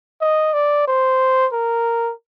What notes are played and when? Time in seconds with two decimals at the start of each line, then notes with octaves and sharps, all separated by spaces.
0.21 D#5
0.54 D5
0.88 C5
1.52 A#4